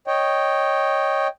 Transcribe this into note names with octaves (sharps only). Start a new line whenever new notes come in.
C#5 D#5 G5